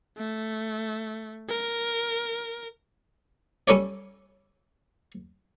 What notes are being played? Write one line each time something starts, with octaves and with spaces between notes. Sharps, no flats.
A3
A#4
G3 C#4 A4 C#5 D5